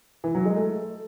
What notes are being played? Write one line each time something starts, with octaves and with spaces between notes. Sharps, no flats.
E3
F#3
G#3
A3